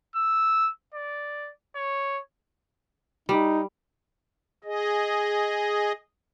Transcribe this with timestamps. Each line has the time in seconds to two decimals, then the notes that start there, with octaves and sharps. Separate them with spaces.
0.16 E6
0.94 D5
1.76 C#5
3.29 G3 D#4
4.64 G#4 D#5